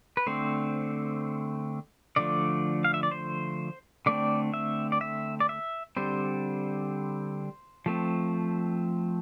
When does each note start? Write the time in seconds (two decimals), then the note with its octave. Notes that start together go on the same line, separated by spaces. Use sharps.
0.17 B4
0.27 D3 A3 C4 C5
2.16 D3 F3 A3 D5
2.84 F5
2.94 E5
3.03 D5
3.11 C5
4.06 D3 A3 C4 D5
4.54 E5
4.92 D5
5.01 E5
5.40 D5
5.49 E5
5.97 D3 G3 C4 C5
7.86 F3 A3 C4